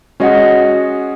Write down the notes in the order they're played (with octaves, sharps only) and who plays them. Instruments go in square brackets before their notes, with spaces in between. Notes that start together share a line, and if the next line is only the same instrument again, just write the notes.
[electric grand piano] G#3 C#4 [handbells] F#4 D#5 F#5